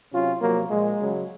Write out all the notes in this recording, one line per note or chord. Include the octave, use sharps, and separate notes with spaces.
C3 F#3 C#4 F4
C3 F3 F#3 A#3
A#2 F3 G#3
C#3 F#3